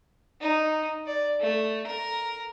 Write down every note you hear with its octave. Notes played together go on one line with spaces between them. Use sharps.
D#4
D5
A3
A#4